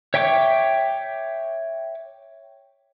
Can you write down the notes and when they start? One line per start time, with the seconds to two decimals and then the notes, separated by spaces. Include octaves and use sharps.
0.14 C#5 E5 G5 C#6 D6